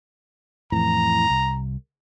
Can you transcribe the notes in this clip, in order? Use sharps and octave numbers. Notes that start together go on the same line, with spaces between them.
F2 A2 E3 A#5
C2